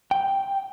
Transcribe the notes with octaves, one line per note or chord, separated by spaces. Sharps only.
G5